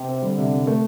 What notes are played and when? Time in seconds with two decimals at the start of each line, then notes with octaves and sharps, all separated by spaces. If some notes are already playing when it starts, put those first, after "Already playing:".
Already playing: C3
0.08 C4
0.23 D3 G3
0.38 C3
0.53 C3
0.67 A3